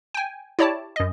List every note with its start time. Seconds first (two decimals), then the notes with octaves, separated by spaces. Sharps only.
0.14 G5 G#5
0.59 E4 G4 C#5 D5 A5 D6
0.96 F#2 D#5